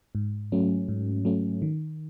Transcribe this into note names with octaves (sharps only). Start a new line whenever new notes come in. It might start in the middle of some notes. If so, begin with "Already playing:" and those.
G#2
F#3 A3 C#4
G#2
F#3 A3 C#4
D#3